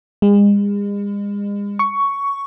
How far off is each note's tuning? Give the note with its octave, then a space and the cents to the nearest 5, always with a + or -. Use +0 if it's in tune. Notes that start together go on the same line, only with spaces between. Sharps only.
G#3 -40
C#6 +10